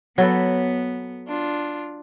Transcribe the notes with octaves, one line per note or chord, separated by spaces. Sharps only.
F#3 B3 A4 B4
D4 F4